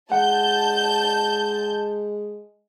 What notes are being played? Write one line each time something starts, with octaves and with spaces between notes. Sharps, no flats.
G#3 F#5 A5 G6